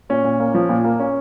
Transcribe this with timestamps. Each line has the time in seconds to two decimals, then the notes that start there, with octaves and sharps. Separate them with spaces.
0.09 A#2 C#4
0.24 A#2
0.40 A#3
0.54 F3
0.69 A#2
0.84 A#3
1.00 C#4